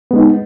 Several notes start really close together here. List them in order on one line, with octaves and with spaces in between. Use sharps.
B3 G#3 D#4